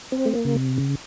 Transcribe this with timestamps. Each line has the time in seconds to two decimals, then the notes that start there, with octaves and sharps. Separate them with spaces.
0.12 C4
0.26 A3
0.34 A#3
0.45 C#3
0.56 C3
0.78 C#3